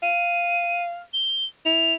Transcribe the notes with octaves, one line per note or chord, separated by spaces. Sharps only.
F5 D#7
G7
E4 F7